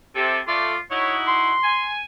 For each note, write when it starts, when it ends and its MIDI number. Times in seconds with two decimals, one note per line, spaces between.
0.15 0.40 48
0.15 0.38 69
0.47 0.74 57
0.47 0.78 65
0.47 0.74 74
0.91 1.53 63
0.91 1.53 64
0.91 1.53 66
0.91 1.14 73
1.27 1.91 84
1.63 2.02 80